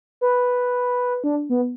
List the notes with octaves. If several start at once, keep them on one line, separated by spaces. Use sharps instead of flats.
B4
D4
B3